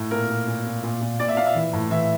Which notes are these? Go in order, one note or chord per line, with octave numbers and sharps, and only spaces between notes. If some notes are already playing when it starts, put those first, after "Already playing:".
Already playing: A2
A#2 A#4
A#2
A#2
A#2
A#2
A#2
A#2 D5
E5
A#2 F5
E5
E3
A2
E3 E5